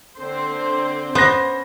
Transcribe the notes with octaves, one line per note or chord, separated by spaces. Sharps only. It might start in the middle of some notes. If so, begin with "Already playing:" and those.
D3 C4 C5
B3 C#4 C5 A#6